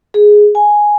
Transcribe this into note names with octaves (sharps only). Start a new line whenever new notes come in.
G#4
G#5